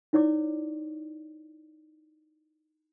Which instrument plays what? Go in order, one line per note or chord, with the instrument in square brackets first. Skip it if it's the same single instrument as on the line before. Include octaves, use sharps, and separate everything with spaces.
[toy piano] D#4 E4 C#5 D5 D6